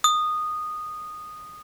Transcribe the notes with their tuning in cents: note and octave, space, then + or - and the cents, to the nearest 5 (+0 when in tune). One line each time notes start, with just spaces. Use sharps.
D#6 -15